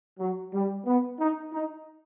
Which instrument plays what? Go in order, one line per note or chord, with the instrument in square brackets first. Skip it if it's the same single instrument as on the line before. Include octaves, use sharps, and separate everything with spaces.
[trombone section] F#3
G3
B3
D#4
D#4